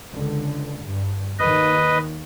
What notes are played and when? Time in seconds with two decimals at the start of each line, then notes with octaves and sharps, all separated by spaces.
0.11 C#2 D3
0.83 G2
1.39 D#2 D#3 B4 D#5